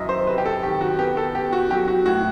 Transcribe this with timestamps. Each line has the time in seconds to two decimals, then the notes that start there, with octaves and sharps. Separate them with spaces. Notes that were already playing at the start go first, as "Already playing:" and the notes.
Already playing: F#2 D#3 E3 D#5 E5
0.09 C5
0.27 C3 B4
0.38 G4
0.46 A4
0.63 D#3 G4
0.81 F#4
0.99 B3 G4
1.17 A4
1.35 B3 G4
1.53 F#4
1.71 F#3 G4
1.88 F#4
2.06 A2 F#4